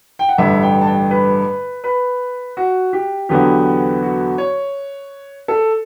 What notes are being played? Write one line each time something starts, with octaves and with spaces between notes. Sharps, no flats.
G5
F#5
A1 G2 D3 E5
G5
A5
G5
B4
B4
F#4
G4
E2 D3 F#3 B3 G4
F#4
C#5
A4